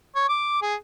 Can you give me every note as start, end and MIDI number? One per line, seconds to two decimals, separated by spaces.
0.16 0.26 73
0.29 0.59 86
0.62 0.75 68